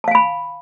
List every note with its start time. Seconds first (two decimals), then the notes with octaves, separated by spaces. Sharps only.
0.04 A5
0.08 F5
0.11 G#5
0.15 B5